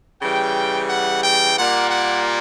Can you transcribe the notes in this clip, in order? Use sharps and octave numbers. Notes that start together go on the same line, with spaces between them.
C#3 E3 G3 G5
F#5
G5
A#2 G3 A#3 F#5
F#5